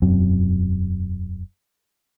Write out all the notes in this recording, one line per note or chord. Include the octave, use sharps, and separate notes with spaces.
E1 F#2 F#3 C4